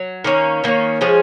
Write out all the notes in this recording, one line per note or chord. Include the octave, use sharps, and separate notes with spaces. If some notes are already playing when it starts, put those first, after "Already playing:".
Already playing: F#3
D#3 A#3 C#4
D#3 A#3 C#4
F3 G#3 C#4 G#4